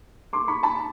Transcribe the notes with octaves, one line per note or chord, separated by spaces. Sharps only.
C6 D6
B5 C#6
A5 B5